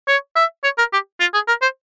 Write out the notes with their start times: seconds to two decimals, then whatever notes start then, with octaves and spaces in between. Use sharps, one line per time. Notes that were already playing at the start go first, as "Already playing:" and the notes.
0.08 C#5
0.36 E5
0.64 C#5
0.78 A#4
0.93 G4
1.20 F4
1.34 G#4
1.48 A#4
1.62 C5